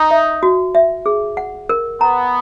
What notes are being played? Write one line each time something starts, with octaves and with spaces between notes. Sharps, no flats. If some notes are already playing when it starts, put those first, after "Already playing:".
Already playing: D#4
E5
F#4
E5
G#4
F#5
A#4
B3 A#5